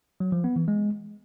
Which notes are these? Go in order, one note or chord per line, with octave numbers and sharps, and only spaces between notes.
F#3
F3
B3
E3
G#3